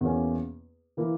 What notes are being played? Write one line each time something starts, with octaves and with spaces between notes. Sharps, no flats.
E2 B2 A#3 C#4
E3 A#3 E4